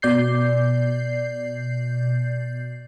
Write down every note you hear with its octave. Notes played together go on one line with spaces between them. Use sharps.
B2 D5 G6 C7